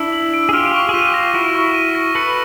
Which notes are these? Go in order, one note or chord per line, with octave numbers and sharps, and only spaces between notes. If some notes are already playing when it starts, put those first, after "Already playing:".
Already playing: D4 E4 E6
F#7
D7
G#4
F4 G4 F6
C#6
G#4
F4 G4 D#7
A#6
E4 F#4 F6
C#6
D#7
A#6
A4 B4 C#7